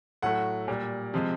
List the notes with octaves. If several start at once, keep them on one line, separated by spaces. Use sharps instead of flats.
A2 F#3 A3 F#5
A#2 G3
C3 F3 G#3